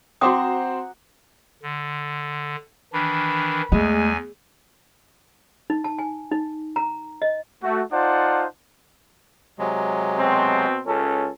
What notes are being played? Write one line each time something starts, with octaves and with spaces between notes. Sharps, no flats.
C4 F#4 C5 F#5 A#5 D6 D#6
D3
D#3 E3 D4 B5
E2 G#3 A3 G#5
D#4
A5
G#5
D#4
A#5
D#5
A3 F#4
D#4 F4 C5 D5 F#5 A5
C3 F#3 G#3
B2 C4
C#2 C#4 A4